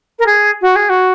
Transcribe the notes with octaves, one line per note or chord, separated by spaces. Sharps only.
A#4
G#4
F#4
G#4
F#4